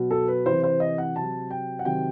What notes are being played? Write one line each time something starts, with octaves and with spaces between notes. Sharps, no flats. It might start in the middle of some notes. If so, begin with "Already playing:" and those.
Already playing: B2 F#3
A4
B4
C3 E3 C5
C5
D#5
F#5
C3 F#3 A5
G5
F#5
C3 D#3 F#3 G5